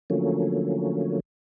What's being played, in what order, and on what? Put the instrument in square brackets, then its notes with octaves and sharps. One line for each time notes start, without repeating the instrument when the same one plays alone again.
[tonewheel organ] D3 F3 F#3 A3 A#3 C#4